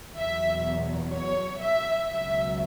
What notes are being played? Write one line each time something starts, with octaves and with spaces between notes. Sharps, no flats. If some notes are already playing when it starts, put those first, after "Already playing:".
E2 B2 F#3 E5
C#5
E5
C#2 B2 F#3 E5